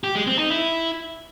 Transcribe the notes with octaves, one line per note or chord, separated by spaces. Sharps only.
G4
G#3
C4
D#4
E4